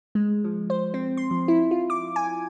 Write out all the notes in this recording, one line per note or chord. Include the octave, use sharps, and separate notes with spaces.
G#3
F3
C5
C4
C6
F3
E4
F4
D6
G#5